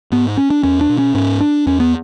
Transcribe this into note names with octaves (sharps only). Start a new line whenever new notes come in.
G#2 B3
C#4
D4
E2 C#4
D4
B2
C#4
G#2 C#4
D4
E2 C#4
B3